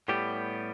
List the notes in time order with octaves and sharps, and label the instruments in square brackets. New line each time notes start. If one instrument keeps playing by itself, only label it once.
[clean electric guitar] A2 G3 B3 G4